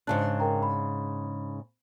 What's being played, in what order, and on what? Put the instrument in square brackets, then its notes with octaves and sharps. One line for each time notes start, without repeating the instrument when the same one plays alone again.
[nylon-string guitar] G#2 C#3 D4 [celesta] A5 F#6
[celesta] A#4 G5 A#5
B5